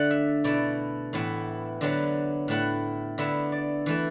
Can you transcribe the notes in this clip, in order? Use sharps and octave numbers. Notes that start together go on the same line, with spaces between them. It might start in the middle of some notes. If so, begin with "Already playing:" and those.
Already playing: D3 A3 D4 F#5
E5
B2 A3 E4 D5
A2 E3 B3 E4
D3 F#3 B3 D4
A2 A3 E4 F#5
D3 B3 E4 E5
D5
E3 A3 E4 B4